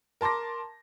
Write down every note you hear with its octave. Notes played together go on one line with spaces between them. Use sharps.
A#4 A5 C6 D6 A#6